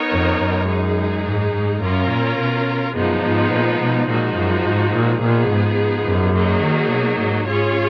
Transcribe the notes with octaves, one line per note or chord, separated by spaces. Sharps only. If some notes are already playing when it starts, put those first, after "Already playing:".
Already playing: B3 D#4 A#4 C#5
F2
F#2
G#3 D#4 G#4
G#2
G#2
F#2 C#4 F4 A#4
A#2
B2
F#2 F3 G#3 B3 D#4
G#2
A#2
B2
A#2 F3 G#3 D#4 F#4
F#2
G#2
A#2
A#2 F3 B3 D#4 G#4
G#2
F#2
F#3 A#3 D#4 G#4
D#3
B2
G#2
G#2 C#4 F4 G#4 C#5